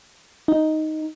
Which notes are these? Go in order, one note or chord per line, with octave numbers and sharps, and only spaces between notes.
D#4